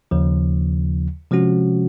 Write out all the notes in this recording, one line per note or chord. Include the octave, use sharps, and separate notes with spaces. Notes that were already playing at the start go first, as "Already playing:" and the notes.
D#2 C#3 F3
C3 F3 G#3 C#4 F#4